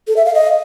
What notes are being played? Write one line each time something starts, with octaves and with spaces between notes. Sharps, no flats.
A4
E5
F5
D#5